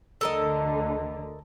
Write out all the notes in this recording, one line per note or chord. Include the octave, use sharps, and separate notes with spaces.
D2 D3 A4 A#4 D#5